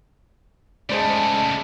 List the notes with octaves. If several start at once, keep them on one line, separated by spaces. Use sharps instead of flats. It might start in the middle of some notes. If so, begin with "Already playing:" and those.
C#3 G#3 A3 G#4 C5 D5 A5 B5